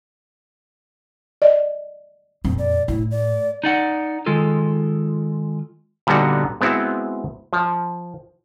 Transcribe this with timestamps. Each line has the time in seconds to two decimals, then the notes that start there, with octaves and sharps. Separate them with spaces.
1.42 D5 D#5
2.44 F2 A#2 C4
2.58 D5
2.88 A2 E4
3.11 D5
3.64 D#4 D5 F#5
4.26 D#3 G#3 F4 A4
6.07 A#2 D3 G3 B3 D#4 F#4
6.61 G#3 B3 C4 E4 F#4
7.53 F3